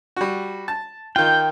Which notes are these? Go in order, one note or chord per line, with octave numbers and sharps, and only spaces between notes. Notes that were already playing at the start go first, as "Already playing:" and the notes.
G3 F#4
A5
D#3 F4 G5 G6